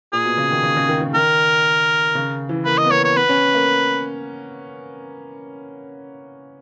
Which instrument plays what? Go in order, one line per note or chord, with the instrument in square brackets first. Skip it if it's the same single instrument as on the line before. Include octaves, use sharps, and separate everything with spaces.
[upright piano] A#2 [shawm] G#4
[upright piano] B2
C#3
D#3
C#3
C#3
D#3
D#3
[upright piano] D#3 [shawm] A#4
[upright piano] C#3
E3
[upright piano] A#3 [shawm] B4
[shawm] D#5
[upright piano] B3
[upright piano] A#3 [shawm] C#5
[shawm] C#5
[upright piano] B3 [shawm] B4
[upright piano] C#4
A#3